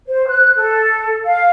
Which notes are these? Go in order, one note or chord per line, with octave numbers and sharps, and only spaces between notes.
C5
F#6
A4
F5